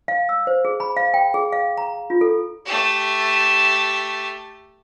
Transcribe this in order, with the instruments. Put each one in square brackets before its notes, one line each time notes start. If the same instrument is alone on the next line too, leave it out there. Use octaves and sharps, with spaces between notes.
[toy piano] F5
E6
C5
G#4
B5
F5
G5
G#4
F5
A#5
F4
A4
[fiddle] A3 G4